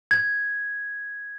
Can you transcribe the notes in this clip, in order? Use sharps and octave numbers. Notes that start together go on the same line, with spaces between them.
G#6